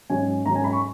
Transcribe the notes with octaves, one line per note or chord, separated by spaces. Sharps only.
G#2 F#3 C#4 G#5
G#2 F#3 C#4 A#5
G#5
B5
C#6